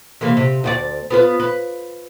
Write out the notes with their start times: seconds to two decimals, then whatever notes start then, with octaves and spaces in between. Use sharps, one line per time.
0.21 C3 E3 A#3
0.37 C3
0.64 D2 F4 D5
1.10 B3 F4 B4
1.40 B4